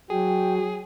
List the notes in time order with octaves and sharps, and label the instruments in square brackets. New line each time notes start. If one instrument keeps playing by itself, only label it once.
[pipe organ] F#3 [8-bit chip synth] G#4 [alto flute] G5